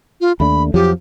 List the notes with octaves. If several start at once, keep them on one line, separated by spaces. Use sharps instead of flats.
F4
D#2 A3 D4 B5
F2 F3 F#3 G4